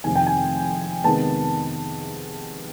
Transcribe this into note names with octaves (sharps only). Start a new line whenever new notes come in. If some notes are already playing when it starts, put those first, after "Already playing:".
F2 C3 D#3 G#5
G5
G#5
C3 D#3 G#3 B3 A5